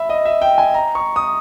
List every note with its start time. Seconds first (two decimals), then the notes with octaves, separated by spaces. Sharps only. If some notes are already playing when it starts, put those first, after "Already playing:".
Already playing: E5 B5
0.09 D#5
0.25 E5
0.42 G5
0.58 G#5
0.74 A#5
0.95 C#6
1.16 D#6